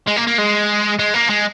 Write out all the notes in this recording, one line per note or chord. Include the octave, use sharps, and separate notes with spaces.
G#3
A#3
A#3
G#3
G#3
A#3
G#3